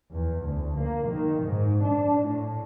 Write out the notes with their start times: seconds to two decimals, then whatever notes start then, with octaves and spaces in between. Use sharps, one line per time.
0.10 E2
0.44 D2
0.78 A#3
1.08 D#3
1.43 G#2
1.83 D4
2.21 A2